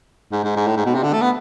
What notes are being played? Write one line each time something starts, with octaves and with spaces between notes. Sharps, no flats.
G#2
G#2
G#2
A2
G#2
B2
C3
D3
A3
B3